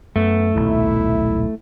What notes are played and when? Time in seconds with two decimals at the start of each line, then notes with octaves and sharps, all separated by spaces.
0.16 F#2 A3 B3
0.55 D#1 B1 F#3 E4